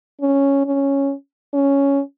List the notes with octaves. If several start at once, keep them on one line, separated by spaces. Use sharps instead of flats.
C#4
C#4
C#4